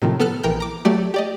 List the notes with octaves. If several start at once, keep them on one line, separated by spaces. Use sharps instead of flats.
A2 C3 D#3 F3
B3 A4 F6 F#6
A#1 E3 A#4 G5 F6 G6
A#5 D6
F#3 A3 G4 D5 A6
G4 D5 D#5